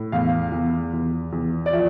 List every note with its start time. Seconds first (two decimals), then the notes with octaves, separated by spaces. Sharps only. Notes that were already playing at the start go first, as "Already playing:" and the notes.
Already playing: A2
0.12 E2 F5
0.52 E2
0.93 E2
1.32 E2
1.66 D5
1.73 F3 E5